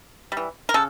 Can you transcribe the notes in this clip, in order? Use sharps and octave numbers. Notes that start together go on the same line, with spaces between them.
G3
E3
A#4
C#3 A4